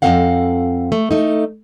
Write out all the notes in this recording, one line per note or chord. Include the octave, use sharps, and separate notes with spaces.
F2 F3 C4 A4 F5 F#5
A3
A3 D#4